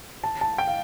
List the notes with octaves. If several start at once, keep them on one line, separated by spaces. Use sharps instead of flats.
A5
A5
G5
F5